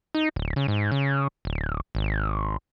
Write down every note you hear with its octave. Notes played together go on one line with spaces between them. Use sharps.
D#4
D1
C#3
G#2
C#3
D1
G#1